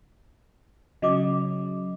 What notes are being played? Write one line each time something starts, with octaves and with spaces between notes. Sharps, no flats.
C#3 F#3 D#5 D6 D#6